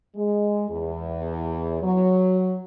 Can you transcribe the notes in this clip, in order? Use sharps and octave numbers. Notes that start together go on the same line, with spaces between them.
G#3
E2
F#3